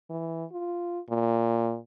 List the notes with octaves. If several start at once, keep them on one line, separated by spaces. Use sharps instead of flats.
E3
F4
A#2